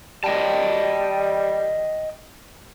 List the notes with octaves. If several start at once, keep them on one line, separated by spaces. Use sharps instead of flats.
G3 D#5 G5 A5